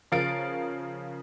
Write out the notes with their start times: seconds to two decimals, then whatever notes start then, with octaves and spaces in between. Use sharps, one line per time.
0.12 C#3 F3 A#4 F5 A6 D7